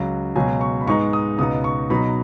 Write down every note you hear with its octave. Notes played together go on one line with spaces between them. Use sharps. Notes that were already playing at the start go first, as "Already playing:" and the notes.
Already playing: C#2 C#3 F#3
C#2 B2 F#3 C#4 G#5
C#6
B5
G#2 G#3 B3 D#4 C#6
D#6
C#2 B2 B3 D#4 D#6
C#6
B2 F#3 D#4 B5